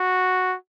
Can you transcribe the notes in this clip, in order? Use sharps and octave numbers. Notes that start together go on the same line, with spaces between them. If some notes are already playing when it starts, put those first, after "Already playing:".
Already playing: F#4